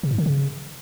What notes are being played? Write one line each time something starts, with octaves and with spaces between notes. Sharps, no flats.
C3
G#2
D3
C#3